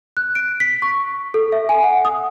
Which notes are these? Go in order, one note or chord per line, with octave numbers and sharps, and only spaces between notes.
F#6
D7
B6
C#6
A4
E5
G#5
F#5
D#6